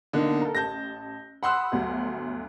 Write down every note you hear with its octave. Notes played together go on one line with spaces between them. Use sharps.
B1 D3 A#3 D#4
A4 A#4
A1 A5 G6 A#6
F#5 B5 C6 D#6 E6 F#6
G1 D2 F#3